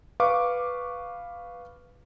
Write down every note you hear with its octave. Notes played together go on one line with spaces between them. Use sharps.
B4 F5 C#6 D6